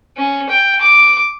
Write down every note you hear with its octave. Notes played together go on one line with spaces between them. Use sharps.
C#4
G5
D6